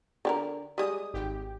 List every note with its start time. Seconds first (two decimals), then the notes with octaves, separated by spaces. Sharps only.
0.25 D3 G4 A#4
0.78 G3 G#3 D#6
1.14 G#1 G4